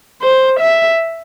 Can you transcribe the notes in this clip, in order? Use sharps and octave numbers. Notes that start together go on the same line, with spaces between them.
C5
E5